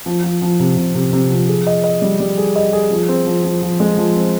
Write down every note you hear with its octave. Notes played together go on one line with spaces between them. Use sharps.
F3
F3
F3
C3
C3
C3
C3
F3
G#4
D#5
D#5
G3
G3
G#4
D#5
G#4
F3
C4
F3
F3
F3
G#3
F3
C4